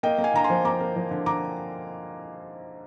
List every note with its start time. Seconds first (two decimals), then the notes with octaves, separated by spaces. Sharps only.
0.03 A#3 D#5 G5
0.18 A#3
0.24 F5 G#5
0.34 D3 A#5
0.44 G#5 C6
0.50 F3
0.65 A#3 A#5 D6
0.80 A#3
0.96 F3
1.11 D3
1.26 D3 A#5 D6